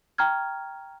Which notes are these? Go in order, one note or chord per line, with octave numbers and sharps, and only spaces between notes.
G5 A#5 C#6 F6 G#6